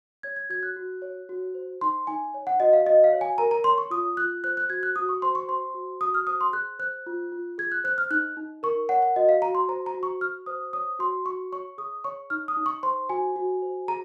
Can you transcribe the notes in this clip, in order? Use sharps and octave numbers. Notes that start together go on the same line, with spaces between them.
C#5 G#6
G#6
F#4 G#6
F#6
F#4
C#5
F#4
C5
D#4 C6
D#4 G#5
C#5
F#5
F#4 D#5
F5
F#4 D#5
F5
C#5
G#5
A#4 A#5
A#5
C#5 C6
C#6
F4 D#6
F4 F#6
C5 F#6
F#6
F#4 G#6
F#6
F#4 D#6
C#6
C5 C6
C#6
C5 C6
F#4
F#4 D#6
F6
C5 D#6
C6
G#4 F#6
C5 F#6
F4
F4
G#4 G#6
F#6
C5 F#6
F6
D#4 F#6
D#4
A#4 C#6
C#5 F#5
F#5
F#4 D#5
F5
F#4 A#5
C6
C5 A#5
A#5
F#4
C#6
F#4 F6
C5 D#6
C#5 D#6
F#4 C6
F#4 C#6
C#5 C#6
G#4 D#6
C#5 C#6
D#4 F6
D#6
D#4
C#6
C5 C6
F#4 G#5
F#4
C5
G#4 A#5